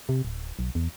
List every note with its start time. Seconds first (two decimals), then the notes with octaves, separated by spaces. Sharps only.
0.09 C3
0.25 D1
0.59 B1
0.75 E2